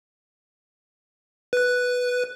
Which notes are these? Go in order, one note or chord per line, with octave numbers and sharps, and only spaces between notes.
B4 F#6